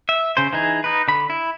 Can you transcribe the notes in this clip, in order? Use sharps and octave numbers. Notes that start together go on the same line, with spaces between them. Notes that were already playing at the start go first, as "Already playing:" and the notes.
E5
C#3 C5
E3 D#4 G#4
D#4 B4
D3 B5
E4